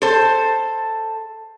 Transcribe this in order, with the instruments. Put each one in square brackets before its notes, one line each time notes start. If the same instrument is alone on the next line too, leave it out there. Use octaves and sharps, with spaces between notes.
[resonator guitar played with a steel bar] A4 C5